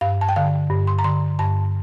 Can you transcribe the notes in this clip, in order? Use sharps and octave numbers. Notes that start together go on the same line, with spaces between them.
G2 F5
A5
G5
D3 F5
G2
C6
A#5
D3 C6
G2 A5